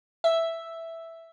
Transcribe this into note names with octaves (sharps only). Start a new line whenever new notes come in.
E5